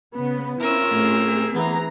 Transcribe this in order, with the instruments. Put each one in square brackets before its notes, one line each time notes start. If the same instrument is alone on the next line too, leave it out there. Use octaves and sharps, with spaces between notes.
[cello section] C#3 [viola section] B3
[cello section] C4 E4 [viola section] C#4 F4 [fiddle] A#4 E6
[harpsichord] A1 A2 [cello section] A3 C4 G#4
[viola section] E3 A#5 [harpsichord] B3 E5